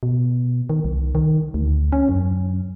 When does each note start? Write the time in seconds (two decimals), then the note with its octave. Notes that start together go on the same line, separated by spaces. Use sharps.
0.03 B2
0.70 D#3
0.84 C2
1.15 D#3
1.54 D2
1.92 C#4
2.09 F#2